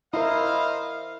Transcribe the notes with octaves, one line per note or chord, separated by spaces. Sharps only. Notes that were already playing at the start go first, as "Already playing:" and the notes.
E4 A#4 C5 D#5 F5